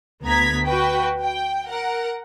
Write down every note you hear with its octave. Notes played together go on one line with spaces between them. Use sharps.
D2 B3 A#5 G#6 B6
F#4 B4 G5
G5
A#4 F#5